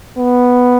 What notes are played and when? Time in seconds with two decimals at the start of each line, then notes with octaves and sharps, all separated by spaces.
0.18 B3